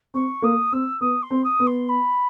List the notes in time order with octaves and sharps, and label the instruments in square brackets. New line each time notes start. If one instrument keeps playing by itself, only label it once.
[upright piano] C4 [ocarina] C#6
[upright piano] A#3 [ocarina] D#6
[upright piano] C4 [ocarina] E6
[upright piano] B3 [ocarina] D#6
[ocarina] C6
[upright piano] C4
[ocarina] D#6
[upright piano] B3
[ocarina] C6
B5